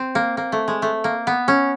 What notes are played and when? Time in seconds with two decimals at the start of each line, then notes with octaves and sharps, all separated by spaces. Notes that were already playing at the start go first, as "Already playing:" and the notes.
Already playing: C4
0.15 A#3
0.37 A#3
0.52 A3
0.68 G#3
0.82 A3
1.04 A#3
1.27 B3
1.48 C#4